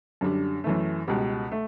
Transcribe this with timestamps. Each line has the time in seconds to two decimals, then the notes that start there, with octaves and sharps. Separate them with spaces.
0.21 F#2 D3 G3 D4
0.64 F#2 E3 A3
1.08 C#2 B2 G3
1.52 A3